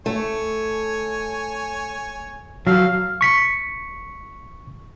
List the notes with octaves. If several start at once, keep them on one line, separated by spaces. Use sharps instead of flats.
A3 C#5 G#5
F#3 A4 F5 E6
C#6 B6 C#7